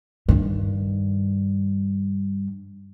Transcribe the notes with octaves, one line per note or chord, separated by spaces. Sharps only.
G2 D#3